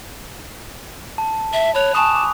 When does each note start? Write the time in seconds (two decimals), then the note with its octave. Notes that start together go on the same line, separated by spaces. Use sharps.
1.18 A5
1.53 E5
1.75 C#5 B5 F#6 F7
1.95 G#5 A5 C#6 D#6
2.15 D6 D#6